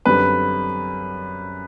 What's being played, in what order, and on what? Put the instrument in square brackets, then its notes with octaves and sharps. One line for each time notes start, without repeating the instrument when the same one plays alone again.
[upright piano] F#2 D3 G3 C4 [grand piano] B4